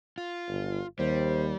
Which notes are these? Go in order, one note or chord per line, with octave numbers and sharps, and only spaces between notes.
F4
G1
D#2 G3 C5